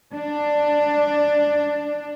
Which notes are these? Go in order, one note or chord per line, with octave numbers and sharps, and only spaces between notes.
D4